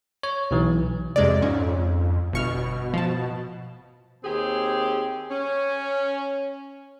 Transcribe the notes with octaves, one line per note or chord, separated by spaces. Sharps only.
C#5
B1 E3
F2 C3 G#3 D5
F2 G#2 C#4
G1 B2 C#6 F6
F3 A5
D#2 C4 G4 G#4
C#4